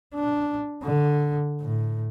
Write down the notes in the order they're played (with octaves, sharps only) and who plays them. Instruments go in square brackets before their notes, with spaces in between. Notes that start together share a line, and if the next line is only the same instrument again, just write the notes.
[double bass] D4
D3
A2